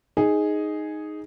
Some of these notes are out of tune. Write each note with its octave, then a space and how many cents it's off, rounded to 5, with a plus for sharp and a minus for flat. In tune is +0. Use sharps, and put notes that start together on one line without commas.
D#4 +0 G#4 +0